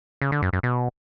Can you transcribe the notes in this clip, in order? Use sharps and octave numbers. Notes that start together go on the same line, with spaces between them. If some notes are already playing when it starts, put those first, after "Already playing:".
C#3
D3
F#2
F#2
B2